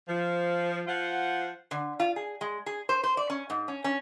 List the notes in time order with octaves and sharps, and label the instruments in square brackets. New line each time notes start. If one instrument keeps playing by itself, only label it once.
[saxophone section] F3
F3 F4 F#5
[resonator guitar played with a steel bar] D3
F4
G#4
G#3
G#4
C5
C5
D5
C#4
G#2
C#4
C#4